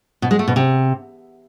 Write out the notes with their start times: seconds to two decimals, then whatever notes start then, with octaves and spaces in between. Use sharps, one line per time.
0.22 B2
0.31 G#3
0.39 A3
0.48 B2
0.56 C3